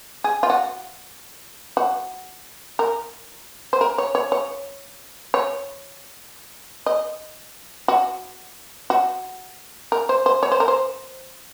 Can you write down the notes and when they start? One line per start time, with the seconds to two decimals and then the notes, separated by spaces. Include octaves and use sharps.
0.24 G#4
0.43 F4
0.50 F#4
1.77 F#4
2.79 A#4
3.73 C5
3.81 A#4
3.98 C#5
4.15 C#5
4.32 C#5
5.34 C#5
6.86 D#5
7.88 F#4
8.90 F#4
9.92 A#4
10.09 C5
10.26 C5
10.43 C#5
10.52 C5
10.60 A#4
10.68 C5